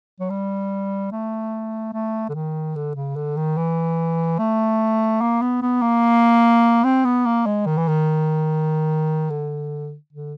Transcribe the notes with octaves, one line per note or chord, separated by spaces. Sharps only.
F#3
G3
A3
A3
D3
D#3
D3
C#3
D3
D#3
E3
A3
A#3
B3
B3
A#3
C4
B3
A#3
G#3
D#3
E3
D#3
D3
D3